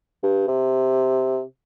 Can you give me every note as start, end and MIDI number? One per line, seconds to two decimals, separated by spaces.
0.23 0.44 43
0.48 1.41 48